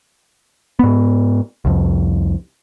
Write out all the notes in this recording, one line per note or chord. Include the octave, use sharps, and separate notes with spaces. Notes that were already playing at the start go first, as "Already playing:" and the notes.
G#2 B3
C2 F2